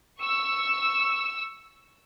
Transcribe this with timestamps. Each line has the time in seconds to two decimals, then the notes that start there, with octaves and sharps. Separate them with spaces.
0.21 C#6 E6